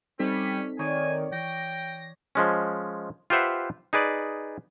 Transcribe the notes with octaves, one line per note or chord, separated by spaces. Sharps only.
G3 C4 C#4 D#4 A4 B6
D#3 C#5 D5 G#5
E3 G5 A#6
F3 G#3 C#4
F4 G4 B4 C5 E5 F#5
D#4 G#4 B4 D5